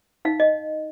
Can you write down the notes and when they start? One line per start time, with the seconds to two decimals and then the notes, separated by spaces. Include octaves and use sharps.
0.25 D#4 F5
0.40 D#5